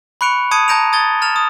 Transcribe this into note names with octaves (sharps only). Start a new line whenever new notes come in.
B5 C#6 F#6 C#7 D7 F7
A5 B5 D#6 G#6 C#7 D#7
A5 A#5 G6 A#6 D7 F7
D#6 G#6 A6 G7
F6 A6 E7 F7
D#6